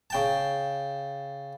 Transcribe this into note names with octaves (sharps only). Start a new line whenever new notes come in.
C#3 G5 A5